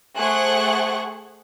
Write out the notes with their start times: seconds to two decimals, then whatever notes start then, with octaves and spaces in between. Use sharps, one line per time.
0.18 A3 G#4 C5 F#5 C#6 F#6